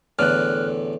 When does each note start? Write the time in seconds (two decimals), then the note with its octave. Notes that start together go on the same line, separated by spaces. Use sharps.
0.19 E2 A2 D3 F6 F#6